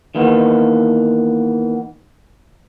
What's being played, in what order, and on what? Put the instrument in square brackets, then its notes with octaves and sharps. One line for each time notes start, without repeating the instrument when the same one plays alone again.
[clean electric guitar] D#3 E3 A#3 B3